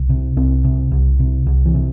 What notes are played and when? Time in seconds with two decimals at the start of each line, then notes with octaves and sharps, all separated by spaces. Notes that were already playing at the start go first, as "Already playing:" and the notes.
Already playing: C2
0.09 C3
0.37 C2 C4
0.64 C3
0.92 C2
1.19 C3
1.47 C2
1.65 E3
1.74 C3